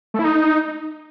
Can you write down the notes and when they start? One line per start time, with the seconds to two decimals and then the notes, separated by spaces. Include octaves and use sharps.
0.14 A3
0.19 E4
0.24 D#4